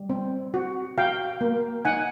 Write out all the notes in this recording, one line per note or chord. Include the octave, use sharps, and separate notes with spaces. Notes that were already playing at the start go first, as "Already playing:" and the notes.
Already playing: G3
C4
F#4
F#4 F5 G5
A#3
D#4 F#5 G#5